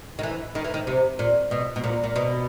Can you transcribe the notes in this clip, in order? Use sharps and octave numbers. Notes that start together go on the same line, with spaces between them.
D#3
E3
D#3
E3
D#3
C3
A#2
B2
B2
A#2
A#2
B2